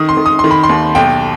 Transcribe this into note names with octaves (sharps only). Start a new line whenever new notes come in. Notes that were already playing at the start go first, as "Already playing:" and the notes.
Already playing: D#3 D#6
C6
D#3
D#6
D#3 C6
B5
C6
D#2
B1 G5